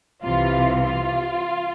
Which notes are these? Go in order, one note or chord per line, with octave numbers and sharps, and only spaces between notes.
C2 C3 E3 F4
F4